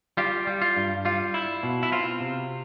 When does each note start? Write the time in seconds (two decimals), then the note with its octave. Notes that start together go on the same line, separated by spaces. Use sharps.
0.17 G3 F4 G4
0.47 G3
0.62 F4
0.77 G2
1.05 G3 F4
1.34 E4
1.63 B2
1.83 E4
1.92 C4 F4
2.21 C3